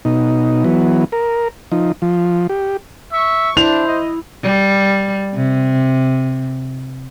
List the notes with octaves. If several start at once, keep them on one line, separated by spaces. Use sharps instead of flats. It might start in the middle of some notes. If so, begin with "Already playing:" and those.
B2 D#4
E3 F#3 B3
A#4
F3 D#4
F3
G4
E5 C#6
D4 E4 C5 F7
D#5
G3
C3